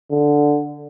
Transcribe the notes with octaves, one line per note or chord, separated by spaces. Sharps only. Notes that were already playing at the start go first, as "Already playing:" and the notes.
D3